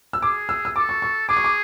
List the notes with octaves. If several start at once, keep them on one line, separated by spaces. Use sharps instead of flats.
E6
G#4 D6
E6
E6
A4 D6
C#6
C#6
G#4 D6
C#6
D6